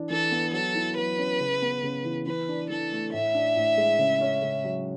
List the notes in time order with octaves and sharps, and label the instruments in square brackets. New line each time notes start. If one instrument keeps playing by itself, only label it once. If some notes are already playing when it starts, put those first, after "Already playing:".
Already playing: [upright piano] E3 D4
[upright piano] E3 [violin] A4
[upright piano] B3
[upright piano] F#3 [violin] A4
[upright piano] E4
[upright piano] F#3 [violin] B4
[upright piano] C#4
C#3
B3
C#3
E3
[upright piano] E3 [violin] B4
[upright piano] D4
[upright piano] E3 [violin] A4
[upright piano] A3
[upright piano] A2 [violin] E5
[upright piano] D4
A2
G#3
C#3
C#4
C#3
F#3